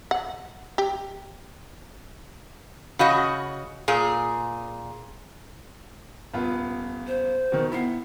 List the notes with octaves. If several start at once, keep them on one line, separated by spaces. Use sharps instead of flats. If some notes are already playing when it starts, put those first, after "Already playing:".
F#5
G4
C#3 F#4 D#5
A#2 G#4
D#1 B3 F4
C5
B2 D#3
B3 E4 C7